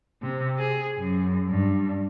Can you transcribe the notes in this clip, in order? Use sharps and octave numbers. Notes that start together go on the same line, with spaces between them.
C3
G#4
F#2
G2